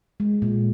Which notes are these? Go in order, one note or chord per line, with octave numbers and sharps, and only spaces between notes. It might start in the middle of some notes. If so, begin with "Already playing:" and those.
G#3
A#2